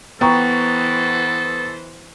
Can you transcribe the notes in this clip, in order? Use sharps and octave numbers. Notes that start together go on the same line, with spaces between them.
E3 B3 A4 C5 G5 A#5 C#6